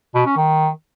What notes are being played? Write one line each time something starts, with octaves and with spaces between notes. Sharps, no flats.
B2
C#4
D#3